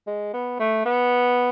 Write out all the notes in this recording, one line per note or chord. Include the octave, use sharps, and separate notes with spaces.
G#3
B3
A3
B3